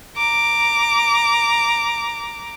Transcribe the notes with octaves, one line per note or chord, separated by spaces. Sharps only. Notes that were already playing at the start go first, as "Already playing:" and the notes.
A#5 D6